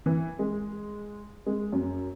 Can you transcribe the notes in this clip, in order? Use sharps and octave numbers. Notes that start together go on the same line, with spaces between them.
E3
G#3
G#3
F#2